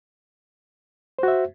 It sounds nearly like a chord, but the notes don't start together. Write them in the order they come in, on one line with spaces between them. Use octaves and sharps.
C5 F#4 E5